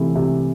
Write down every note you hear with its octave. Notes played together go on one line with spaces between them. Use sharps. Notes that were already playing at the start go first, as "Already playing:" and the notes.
Already playing: C3 E3 A3
C3